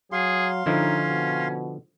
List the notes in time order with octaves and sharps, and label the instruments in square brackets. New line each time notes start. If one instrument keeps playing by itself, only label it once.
[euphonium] F#3 [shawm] G#4 [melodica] F5 C6
[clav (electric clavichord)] D3 F3 E4 [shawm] C#4 [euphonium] D#4
[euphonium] B2